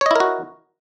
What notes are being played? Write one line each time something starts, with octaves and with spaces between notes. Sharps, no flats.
E4 F#4 A#4 C#5 D#5